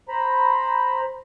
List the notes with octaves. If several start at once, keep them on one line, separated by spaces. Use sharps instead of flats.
C5 A#5 B5